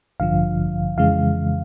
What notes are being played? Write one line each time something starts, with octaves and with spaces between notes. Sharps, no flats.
A1 G2 D3 F3 F5
F2 C#3 E3 G#3 F5